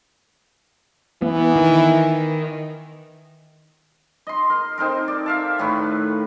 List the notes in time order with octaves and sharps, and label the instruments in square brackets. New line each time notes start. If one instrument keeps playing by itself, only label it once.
[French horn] E3 [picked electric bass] B3
[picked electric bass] D#3
[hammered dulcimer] D#5 C6
A#4
C4 D#4 A4 A#4
D5
E5 F5 A5
A2 D#3 A3 B4